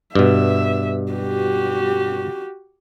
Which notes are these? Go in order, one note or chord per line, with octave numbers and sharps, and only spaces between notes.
G2 B2 E5
F#4 G4